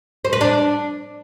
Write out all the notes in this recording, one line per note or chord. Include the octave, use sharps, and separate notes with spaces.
C5
B4
D4